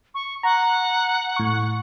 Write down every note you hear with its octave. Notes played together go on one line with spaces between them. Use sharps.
C#6
F#5 A#5
A2 C#6